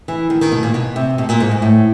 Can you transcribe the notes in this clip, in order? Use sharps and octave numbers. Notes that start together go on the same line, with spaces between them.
E3
D#3
D#3
B2
A#2
B2
C3
B2
A#2
G#2
G#2
A2